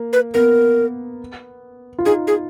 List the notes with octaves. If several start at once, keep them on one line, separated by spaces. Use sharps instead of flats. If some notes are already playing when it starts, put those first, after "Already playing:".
Already playing: A#3
B4
B3 A#4
F4
D#4 G#4
G#4